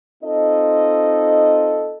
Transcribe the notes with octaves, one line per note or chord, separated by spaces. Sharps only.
C4 D#4 F4 A4 D#5